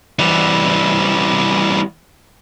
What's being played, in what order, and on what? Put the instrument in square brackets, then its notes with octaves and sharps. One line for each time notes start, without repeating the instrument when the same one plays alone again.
[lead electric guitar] E3 G3